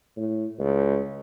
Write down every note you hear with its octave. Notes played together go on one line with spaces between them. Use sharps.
A2
C#2